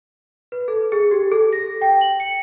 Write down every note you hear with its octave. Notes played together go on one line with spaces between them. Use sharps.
B4
A4
G#4
G4
A4
A#6
G5
F#7
C#7